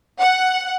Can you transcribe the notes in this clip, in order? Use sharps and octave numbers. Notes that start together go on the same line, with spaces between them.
F#5